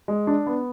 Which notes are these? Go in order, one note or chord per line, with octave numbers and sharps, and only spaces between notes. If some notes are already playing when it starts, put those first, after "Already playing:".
G#3
D4
B3